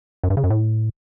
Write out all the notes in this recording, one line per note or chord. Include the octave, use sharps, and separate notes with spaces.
F#2
G2
C#3
F#2
A2